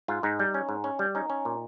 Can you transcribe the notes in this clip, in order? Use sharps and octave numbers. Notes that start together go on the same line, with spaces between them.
G#2 F4
G#2 D#4
G3
C#4
G#2
C#4
G3
C#4 D#4
C#4
A#2